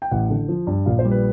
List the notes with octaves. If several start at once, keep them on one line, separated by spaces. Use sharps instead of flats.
G5
A1 F#5
D3
F3
G2
A#1 F5
C5
G3
B4